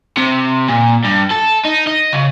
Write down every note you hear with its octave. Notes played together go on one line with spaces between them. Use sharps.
C3
A#2
G2
A4
D#4
D#5
C#3